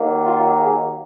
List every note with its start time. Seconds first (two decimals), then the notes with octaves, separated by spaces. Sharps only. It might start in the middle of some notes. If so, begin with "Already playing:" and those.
Already playing: D#2 D#3 F#3 A#3
0.26 F4
0.60 G#4